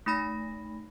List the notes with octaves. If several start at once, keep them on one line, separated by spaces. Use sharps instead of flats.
A3 D#4 B5 A#6